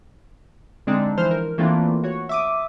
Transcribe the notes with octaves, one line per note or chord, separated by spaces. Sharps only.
D3 G#3 C4 D4 D#4
E3 F3 C5 F6
A#4
E3 A3 A#3 C4 D4 F4
F#4 C#5
E5 D6 D#6